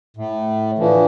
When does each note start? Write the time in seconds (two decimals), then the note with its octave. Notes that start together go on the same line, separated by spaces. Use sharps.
0.17 A2
0.78 D3 E3 F3